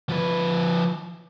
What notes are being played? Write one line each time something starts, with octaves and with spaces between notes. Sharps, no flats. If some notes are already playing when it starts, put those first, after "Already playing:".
F3 B4